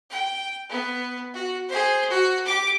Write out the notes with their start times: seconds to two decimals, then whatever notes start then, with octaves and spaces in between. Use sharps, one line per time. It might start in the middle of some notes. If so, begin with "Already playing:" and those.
0.10 G5
0.69 B3
1.34 F#4
1.69 G#4 C5
2.09 F#4
2.45 G4 D6